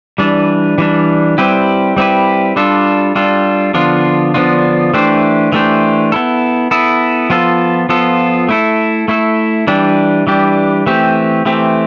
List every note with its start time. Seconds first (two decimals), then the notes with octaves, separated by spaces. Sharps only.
0.18 E3 G3 D4
0.78 E3 G3 D4
1.38 G3 C4 E4 G4 B4
1.97 G3 C4 E4 G4 B4
2.56 G3 D4 F4 A4
3.15 G3 D4 F4 A4
3.74 D3 F3 B3 D4 F4
4.34 D3 F3 B3 D4 F4
4.94 E3 A3 D4 G4 C5
5.52 E3 A3 D4 G4 C5
6.12 B3 E4 A4
6.71 B3 E4 A4
7.30 F3 B3 F4 A4
7.89 F3 B3 F4 A4
8.49 A3 E4 A4
9.08 A3 E4 A4
9.67 E3 G3 D4 G4
10.27 E3 G3 D4 G4
10.86 E3 A3 C4 G4
11.46 E3 A3 C4 G4